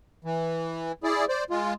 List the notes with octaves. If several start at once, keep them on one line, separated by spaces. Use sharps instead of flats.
E3
E4 G#4 D5
C5 D5
G#3 F4